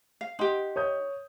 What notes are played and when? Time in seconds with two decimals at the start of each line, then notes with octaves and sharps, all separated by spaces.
0.21 F5
0.39 D#4 G4 F#5 C6
0.76 C#5 D#6 G6